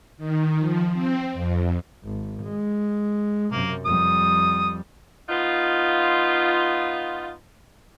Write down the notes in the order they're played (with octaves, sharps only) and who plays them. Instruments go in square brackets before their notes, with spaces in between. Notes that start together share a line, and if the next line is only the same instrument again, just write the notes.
[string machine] D#3
F3
C4
F2
[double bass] G#1
G#3
[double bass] F#2 C3 [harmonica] A#3
[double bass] F2 G3 [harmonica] D#6
[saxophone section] B3 D#4 F4